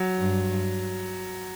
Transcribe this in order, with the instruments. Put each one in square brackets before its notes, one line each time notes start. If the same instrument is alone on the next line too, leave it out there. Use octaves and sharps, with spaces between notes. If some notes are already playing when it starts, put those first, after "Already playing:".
Already playing: [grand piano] F#3
[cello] G2